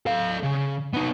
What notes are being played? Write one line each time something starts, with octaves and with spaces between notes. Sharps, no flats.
A4 F5
C#3
B3 D#4